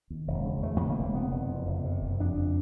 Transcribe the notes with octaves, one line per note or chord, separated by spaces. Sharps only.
D#2
E1
C#3
E1 A3
D#2
A#3
E1
C3 B3
F#1
F2
F#1
C3
F#1
F2 D4